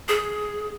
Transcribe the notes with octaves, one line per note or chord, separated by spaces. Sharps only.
G#4